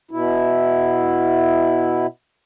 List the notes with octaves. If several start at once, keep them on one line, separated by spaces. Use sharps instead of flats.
B2 E4